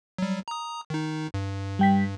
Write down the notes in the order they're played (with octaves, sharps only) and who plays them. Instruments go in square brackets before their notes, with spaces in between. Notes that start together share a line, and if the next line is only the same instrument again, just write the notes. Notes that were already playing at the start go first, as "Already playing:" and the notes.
[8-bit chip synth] F#3 G3
A#5 D#6
D#3 D#4
G2
[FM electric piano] G3 G5 B6